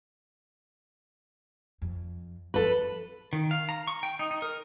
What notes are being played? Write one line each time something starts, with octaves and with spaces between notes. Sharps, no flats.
F2
F#2 F3 A4 B4
D#3
F5
A#5
C#6
G5
D#4
D#4
A#4